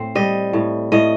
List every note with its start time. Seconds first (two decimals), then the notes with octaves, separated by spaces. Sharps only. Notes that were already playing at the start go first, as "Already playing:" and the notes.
Already playing: A2 C4
0.15 G3 D#5
0.53 A2
0.92 A2 D#5